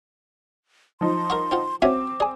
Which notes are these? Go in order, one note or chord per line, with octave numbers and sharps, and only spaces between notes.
F3 D#4 C6
A#4 E5 F#5 C#6
C4 F4 F#5
C4 C#4 F#4 C#5 E5 G#5 D6
G#4 D5 G#5